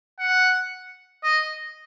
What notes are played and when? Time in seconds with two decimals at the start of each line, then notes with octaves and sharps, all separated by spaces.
0.19 F#5
1.23 D#5